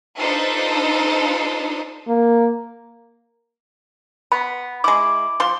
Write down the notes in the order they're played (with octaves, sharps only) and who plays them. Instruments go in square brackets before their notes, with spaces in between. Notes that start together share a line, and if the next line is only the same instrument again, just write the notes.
[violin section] D4 D#4 F4 A4 B4 C5
[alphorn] A#3
[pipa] B3 [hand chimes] B5
[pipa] G#3 E4 [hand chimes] D6
[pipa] F3 C6